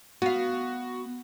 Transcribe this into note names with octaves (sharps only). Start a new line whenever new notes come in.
B3 F#4 F5